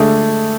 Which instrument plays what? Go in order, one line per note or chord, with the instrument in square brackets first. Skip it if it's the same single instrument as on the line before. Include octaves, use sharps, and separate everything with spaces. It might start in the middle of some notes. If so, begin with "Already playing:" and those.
Already playing: [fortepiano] D3 G#3 D4 G#4 [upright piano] A3